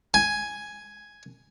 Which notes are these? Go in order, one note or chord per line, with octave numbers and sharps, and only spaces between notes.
G#5